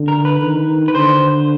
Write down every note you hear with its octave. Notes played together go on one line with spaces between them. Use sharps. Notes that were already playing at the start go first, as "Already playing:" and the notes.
Already playing: D3
A#4
B4
D#3
B4
D3 C5